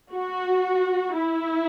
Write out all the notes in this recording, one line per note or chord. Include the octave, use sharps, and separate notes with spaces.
F#4
E4